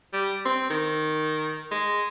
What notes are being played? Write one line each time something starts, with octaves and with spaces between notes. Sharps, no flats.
G3
C4
D#3
G#3